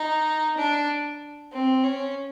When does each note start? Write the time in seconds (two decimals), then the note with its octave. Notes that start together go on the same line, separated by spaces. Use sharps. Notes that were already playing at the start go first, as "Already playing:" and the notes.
Already playing: D#4
0.58 D4
1.53 C4
1.83 C#4